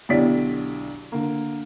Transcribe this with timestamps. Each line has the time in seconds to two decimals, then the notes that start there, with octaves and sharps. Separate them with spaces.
0.09 B1 D3 E4 G4 D5 B6
1.12 D3 A#3